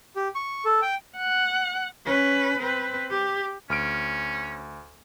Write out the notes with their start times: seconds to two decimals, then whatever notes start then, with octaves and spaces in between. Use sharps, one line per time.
0.16 G4
0.35 C#6
0.65 A4
0.82 G5
1.18 F#5
2.06 C#4 B4
2.59 C4 B4
3.11 G4
3.70 D2 C#4 F6 D7